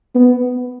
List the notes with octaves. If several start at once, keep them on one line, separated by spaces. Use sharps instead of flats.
B3